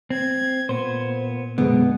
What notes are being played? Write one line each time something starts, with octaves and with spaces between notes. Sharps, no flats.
C4 G#6
A#2 B3 C5
F#2 B2 D3 G#3 B3